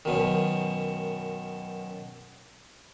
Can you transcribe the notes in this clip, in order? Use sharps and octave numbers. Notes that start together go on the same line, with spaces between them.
F#2 B2 D#3